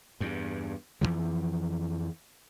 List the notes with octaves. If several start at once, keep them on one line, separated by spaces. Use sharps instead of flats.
E2 G2
F2 C#3 E3 F3